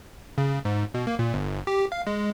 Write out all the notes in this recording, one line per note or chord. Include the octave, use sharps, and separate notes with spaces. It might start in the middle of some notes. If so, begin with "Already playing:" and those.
C#3
G#2
B2
A#3
A#2
G1
G4
F5
G#3